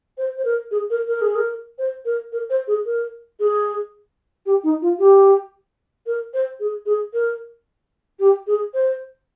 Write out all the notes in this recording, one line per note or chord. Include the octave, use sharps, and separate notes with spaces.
C5
C5
A#4
G#4
A#4
A#4
G#4
A#4
C5
A#4
A#4
C5
G#4
A#4
G#4
G4
D#4
F4
G4
A#4
C5
G#4
G#4
A#4
G4
G#4
C5